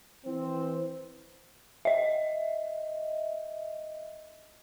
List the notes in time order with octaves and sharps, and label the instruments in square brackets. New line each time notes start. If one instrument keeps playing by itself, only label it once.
[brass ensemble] E3 C4
[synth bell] D#5 E5